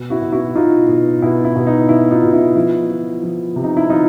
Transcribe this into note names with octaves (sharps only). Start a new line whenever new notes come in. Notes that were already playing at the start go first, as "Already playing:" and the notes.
Already playing: B2
E4 F#4
B2
E4 F#4
B2 D#4 F4
B2
B2 E4
E4
B2
D#4
B2 E4
D#4 F4
B2
E4
F3 E4
F3
F3
C3
D#4
E4
F3 D#4 F4